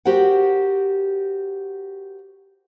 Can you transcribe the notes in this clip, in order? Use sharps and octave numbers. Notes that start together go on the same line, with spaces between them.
F#4 G4 A#4 C5 F#5